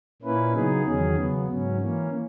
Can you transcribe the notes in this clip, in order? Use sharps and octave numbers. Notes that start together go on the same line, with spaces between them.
A#2 A#3 C#4 E4 B4
C#3 F#3 B3 D#4 G#4
E2 D#3 F#3 C#4 G#4
C#3 F#3 B3
G#2 F#3 C#4
E3 A#3 C#4